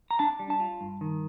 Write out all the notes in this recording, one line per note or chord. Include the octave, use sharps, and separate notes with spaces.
A#5
D4 A5
G3
A5
F4
G2
D#3